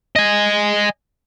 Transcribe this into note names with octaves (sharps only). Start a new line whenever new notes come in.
D#5 G#5